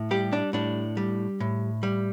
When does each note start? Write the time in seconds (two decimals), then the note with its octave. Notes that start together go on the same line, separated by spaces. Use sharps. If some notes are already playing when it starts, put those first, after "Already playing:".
Already playing: A2
0.11 G3 G4
0.33 D4
0.53 A2 D4
0.97 G3
1.40 A2
1.83 G3